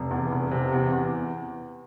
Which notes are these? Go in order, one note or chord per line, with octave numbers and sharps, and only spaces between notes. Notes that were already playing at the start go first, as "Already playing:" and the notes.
Already playing: F1
E2
F1
C3
E2
E2